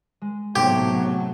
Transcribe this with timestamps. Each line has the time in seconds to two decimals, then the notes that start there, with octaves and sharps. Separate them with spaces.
0.22 G#3
0.56 B1 A2 C3 F#3 G4 D5 C6